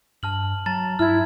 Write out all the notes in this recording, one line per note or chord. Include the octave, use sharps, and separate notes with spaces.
G2 A5 F6 F#7
F#3 A5 A#5 A6
G2 E4 F6 G#6